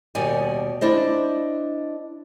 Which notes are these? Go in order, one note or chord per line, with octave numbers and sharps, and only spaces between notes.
D#2 B2 G3 D5 G#5
D4 E4 C5 D#5